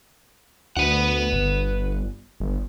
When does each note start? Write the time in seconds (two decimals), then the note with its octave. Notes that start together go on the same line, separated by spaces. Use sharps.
0.77 D2 B4 F#5
1.33 G1
2.40 G1